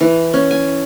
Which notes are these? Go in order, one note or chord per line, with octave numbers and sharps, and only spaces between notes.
E3
C#4
G#5